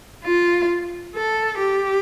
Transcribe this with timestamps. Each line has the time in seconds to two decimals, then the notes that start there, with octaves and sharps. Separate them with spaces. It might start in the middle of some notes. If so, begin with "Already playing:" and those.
0.24 F4
1.15 A4
1.59 G4